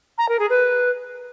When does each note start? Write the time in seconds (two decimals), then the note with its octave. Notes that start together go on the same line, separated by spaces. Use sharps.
0.18 A#5
0.28 A#4
0.39 G#4
0.50 B4